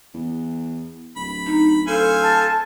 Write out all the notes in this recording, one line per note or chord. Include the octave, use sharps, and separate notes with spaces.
E2
D1 B5
D#4
A4 C5 F5 G#5
A5